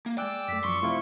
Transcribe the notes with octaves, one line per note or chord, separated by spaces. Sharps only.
A#3
G#3 D5 G5 G#5 D6 E6 F#6
F#2 A3 B6
F#2 F3 C6 C#6
C3 A3 E4 F4 C5